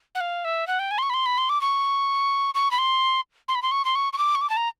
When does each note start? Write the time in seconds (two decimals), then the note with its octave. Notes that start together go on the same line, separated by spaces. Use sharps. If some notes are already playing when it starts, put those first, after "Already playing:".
0.15 F#5
0.20 F5
0.45 E5
0.67 F#5
0.79 G5
0.91 G#5
0.98 C6
1.03 C#6
1.10 B5
1.14 C6
1.26 B5
1.38 C6
1.49 D6
1.61 C#6
2.54 C#6
2.71 B5
2.78 C6
3.48 C6
3.55 B5
3.62 C6
3.71 C#6
3.85 C6
3.95 C#6
4.13 C#6
4.18 D6
4.35 C#6
4.41 D6
4.50 A5
4.57 A#5